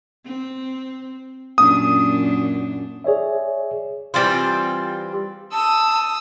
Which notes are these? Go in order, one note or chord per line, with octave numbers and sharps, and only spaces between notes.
C4
F#2 A#2 D4 D#6
G#4 C#5 D5 E5
E3 G3 C4 F4
A5 D#6 E6